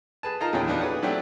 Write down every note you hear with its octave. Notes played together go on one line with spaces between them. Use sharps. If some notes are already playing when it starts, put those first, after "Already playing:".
G#4 B4 A5
D#4 F4 A#4 A5 A#5
E2 A#2 D#3 C#4 G#4 G5
F3 B3 D4 D#4 F#4
G#4 B4 C#5 F#5
F#3 A3 C4 D4 F#4 G4